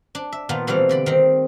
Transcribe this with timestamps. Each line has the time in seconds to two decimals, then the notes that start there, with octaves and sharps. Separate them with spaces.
0.15 D4
0.32 E5
0.49 A#2 D#3 B3 F4
0.67 B2 E3 G3 A3 C4 F5
0.89 D3 D5 B5
1.06 D#3 C4